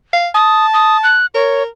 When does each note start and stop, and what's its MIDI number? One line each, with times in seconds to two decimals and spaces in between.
0.13 0.28 77
0.35 1.17 81
0.35 0.66 87
0.74 0.97 87
1.04 1.26 90
1.35 1.67 70
1.35 1.63 73